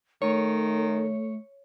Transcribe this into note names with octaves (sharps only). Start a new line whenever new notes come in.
D#3 A3 C#5